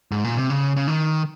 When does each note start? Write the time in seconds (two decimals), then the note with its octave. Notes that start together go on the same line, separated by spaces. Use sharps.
0.12 G#2
0.24 A#2
0.37 C3
0.50 C#3
0.76 C#3
0.88 D#3